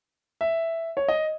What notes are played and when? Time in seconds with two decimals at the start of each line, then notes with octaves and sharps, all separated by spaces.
0.41 E5
0.97 C#5
1.08 D#5